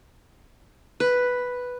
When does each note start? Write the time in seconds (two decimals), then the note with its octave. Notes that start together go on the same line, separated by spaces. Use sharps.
1.00 B4